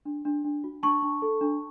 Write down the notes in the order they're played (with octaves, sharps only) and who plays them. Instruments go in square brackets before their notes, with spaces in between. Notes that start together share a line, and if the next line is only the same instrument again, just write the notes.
[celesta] D4
D4
D4
F#4
D4 A5 C#6
D4
A4
D4